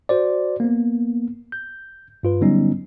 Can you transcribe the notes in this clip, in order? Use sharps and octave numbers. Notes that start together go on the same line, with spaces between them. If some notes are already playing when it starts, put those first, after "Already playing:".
F#4 C5 D5
A#3 B3
G6
G2 F4 B4
D3 F#3 G3 B3 C#4 D#4